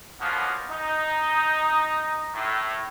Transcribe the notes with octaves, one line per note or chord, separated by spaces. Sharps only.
B2 F3 A#3 B3 C#4 F4
D#4
A2